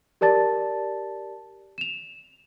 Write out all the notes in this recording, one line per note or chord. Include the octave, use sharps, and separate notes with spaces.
G4 A#4 D5 A5 A6
E7 F7